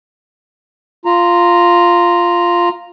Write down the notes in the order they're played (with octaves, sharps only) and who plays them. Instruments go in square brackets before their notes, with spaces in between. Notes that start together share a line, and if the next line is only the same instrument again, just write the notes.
[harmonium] F4 A#5